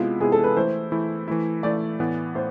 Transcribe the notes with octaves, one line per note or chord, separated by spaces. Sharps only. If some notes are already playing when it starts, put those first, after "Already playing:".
Already playing: C3 G#3 B3 E4 F4
C3 G#3 B3 E4 G#4
A4
B4
E3 A3 E4 C5
E3 A3 E4
E3 A3 E4
E3 A3 E4 D5
A2 E3 B3
A2 C5